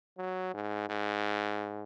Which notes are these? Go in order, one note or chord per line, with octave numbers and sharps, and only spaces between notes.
F#3
G#2
G#2